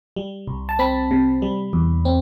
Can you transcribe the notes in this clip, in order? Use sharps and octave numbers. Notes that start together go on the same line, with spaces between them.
G3
C2
A5
C4 B5
C3
G3
E2
C4